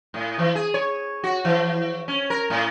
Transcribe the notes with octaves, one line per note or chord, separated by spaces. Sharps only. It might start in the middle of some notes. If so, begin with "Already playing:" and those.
A2
E3
G#4
C#5
F#4
E3
C#4
A#4
A2